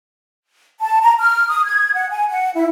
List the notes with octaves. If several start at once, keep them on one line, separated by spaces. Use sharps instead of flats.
A5
A#5
F6
D#6
G#6
F#5
G#5
F#5
E4